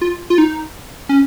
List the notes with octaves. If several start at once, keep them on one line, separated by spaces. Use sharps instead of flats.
F4
F4
D#4
C#4